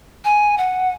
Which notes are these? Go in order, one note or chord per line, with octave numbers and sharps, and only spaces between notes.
G#5
F#5